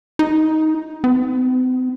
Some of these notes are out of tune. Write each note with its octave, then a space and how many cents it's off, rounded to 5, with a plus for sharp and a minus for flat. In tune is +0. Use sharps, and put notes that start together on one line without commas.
D#4 +15
C4 -45